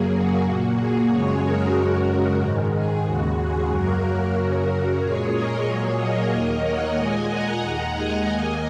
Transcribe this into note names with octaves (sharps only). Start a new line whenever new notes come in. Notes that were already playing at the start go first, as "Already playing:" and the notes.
Already playing: F#2 C#3 F#3 A#3 G#4
F#4
A#2 A#3
G#4
F#2 C#3 G#3 G#4 C#5
F#4 A#4
F#2 C#3 G#3
G#2 D#3 G#3
G#4
D#2 C#3 G#3 F#4
G#4
F#2 F#3 A#3 F#4 A#4
F#2 C#3 F#3 F#4 A#4
A#2 G#3 G#4 C#5
A#4 D#5
A#2 F#3 A#3 G#4 C#5
A#4 D#5
D#2 D#3 A#3
C#5 F#5
A#2 G#3 D#5 G#5
F#5 A#5
D#2 D#3 G#3
D#5 G#5
D#2 D#3 A#3 D#5 G#5